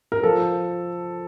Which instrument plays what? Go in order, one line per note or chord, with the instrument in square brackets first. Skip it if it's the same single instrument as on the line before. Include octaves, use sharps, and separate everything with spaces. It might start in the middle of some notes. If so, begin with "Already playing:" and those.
[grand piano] A#4
F3 A4